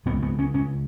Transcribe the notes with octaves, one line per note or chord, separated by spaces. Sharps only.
C#2 C#3 B3
B3
C#4
C#4